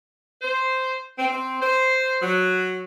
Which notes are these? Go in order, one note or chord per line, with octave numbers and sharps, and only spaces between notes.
C5
C4
C4
C5
F#3